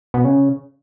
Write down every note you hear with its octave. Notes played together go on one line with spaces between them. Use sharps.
B2
C#3